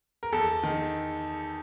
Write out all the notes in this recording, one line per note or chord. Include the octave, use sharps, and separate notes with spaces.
A#4
E2 A4
D#3